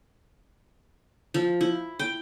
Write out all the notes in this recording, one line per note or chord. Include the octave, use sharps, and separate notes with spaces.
F3
E4
G5